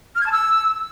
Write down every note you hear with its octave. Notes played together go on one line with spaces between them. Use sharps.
F6
G#6
A5
E6